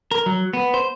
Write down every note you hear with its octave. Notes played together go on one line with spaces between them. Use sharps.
A#4
F#3
B3
C5